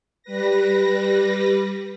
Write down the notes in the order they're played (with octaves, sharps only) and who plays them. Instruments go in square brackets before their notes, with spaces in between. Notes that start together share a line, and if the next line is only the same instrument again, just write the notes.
[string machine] G3 B4 A#6